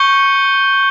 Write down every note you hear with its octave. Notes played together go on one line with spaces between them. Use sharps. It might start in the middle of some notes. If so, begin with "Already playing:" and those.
Already playing: C#6 G6 C#7 G7